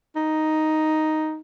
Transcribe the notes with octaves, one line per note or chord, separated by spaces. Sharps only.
D#4